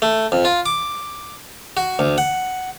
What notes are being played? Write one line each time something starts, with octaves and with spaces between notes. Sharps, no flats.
A3
F2
F4
D6
F#4
D2
F#5